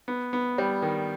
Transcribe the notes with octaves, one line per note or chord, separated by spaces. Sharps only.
B3
B3
G3
D#3